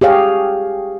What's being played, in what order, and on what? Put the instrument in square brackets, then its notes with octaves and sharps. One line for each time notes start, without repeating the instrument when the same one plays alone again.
[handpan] G4 G#4 C#5 F5